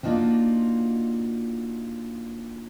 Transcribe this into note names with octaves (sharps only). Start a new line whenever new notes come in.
A#3 D4 D#4 F4 F#4